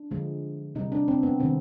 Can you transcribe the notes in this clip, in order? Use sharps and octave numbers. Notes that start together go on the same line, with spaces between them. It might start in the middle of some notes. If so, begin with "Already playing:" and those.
Already playing: D4
D3 F3 G#3
C3 G3 D#4
D4
C4
B3
C3 D#3 G#3 C4